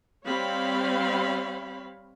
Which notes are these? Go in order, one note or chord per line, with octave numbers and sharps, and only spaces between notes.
G3 C4 C#5 F5 B5